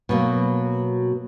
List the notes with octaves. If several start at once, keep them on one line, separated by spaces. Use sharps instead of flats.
B2 F#3 A#3